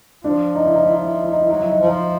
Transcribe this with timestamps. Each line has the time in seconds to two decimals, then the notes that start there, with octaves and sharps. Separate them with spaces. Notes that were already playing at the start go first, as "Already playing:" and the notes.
0.24 F3 D4
0.55 D#4
0.64 E4
0.74 D#4
0.85 E4
0.94 D#4
1.03 E4
1.13 D#4
1.22 E4
1.32 D#4
1.41 E4
1.49 F#3 D#4
1.60 E4
1.70 D#4
1.79 F3 E4
1.88 D#4